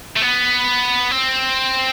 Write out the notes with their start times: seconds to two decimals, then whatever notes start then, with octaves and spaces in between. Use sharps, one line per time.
0.16 A3
0.22 B3
1.11 C4